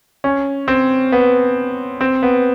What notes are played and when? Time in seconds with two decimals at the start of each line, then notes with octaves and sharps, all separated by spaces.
0.24 C#4
0.68 C4
1.12 B3
2.01 C4
2.23 B3